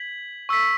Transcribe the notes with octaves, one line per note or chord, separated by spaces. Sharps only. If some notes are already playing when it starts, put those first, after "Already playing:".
Already playing: G#6 B6 F#7
C#6 E6 B6